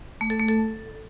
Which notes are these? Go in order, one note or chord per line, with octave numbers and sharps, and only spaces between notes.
A3
A4
A3
A4